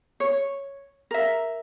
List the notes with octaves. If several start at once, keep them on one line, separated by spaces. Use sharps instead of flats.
C#5
A#4 E5